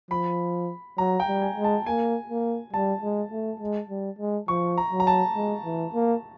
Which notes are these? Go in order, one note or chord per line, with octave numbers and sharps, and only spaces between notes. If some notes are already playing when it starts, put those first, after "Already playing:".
F3 B5
F#3 A#5
G5
G3
G#5
G#3
A5
A#3 G#5
A#3
G3 A5
G#3
A3
G#3
G3
G#3
F3 C#6
A#5
F#3
A#5
A5
G#3
E3
A#3